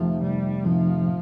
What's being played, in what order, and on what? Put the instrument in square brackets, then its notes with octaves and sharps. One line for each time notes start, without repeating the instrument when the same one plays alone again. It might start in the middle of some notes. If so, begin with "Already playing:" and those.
Already playing: [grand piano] F1 F2 C3 D#3 A3 [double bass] F3
[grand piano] F1 [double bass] G3
[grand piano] F2 C3 D#3 A3 [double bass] F3
[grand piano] A#2